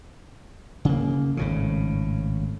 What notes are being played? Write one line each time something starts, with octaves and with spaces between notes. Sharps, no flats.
C#3 A#3
G#1 A2 C#3